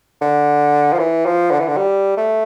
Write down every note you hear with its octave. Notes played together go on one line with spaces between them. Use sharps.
D3
F3
E3
F3
D3
E3
D3
G3
A3